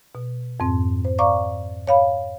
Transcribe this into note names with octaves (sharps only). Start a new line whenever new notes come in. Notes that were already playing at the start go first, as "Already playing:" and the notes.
B2
F2 G#2 C4
C5
D5 F5 A#5 C#6 D6
C#5 F5 B5